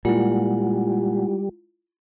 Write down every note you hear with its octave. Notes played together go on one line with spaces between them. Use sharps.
A#2 G3 G#3 E4 F4 F#5